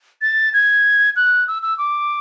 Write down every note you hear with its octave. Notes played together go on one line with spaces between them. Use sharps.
A6
G#6
F#6
E6
E6
D6